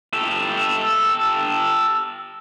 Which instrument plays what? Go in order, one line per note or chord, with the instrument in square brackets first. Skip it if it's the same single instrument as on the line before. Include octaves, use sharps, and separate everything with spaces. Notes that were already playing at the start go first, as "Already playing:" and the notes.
[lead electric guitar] G4 A4